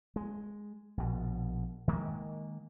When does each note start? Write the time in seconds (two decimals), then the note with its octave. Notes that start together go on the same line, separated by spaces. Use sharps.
0.16 G#3
0.97 A#1 B2
1.88 D#3 G#3 A#3